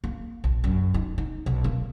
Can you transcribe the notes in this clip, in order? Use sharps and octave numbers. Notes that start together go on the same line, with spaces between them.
A#3
A#1
F#2
D#4
D#4
B1
A#3